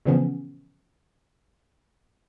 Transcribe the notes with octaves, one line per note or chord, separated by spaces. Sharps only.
A#2 C#3 E3 F3 B3 C#4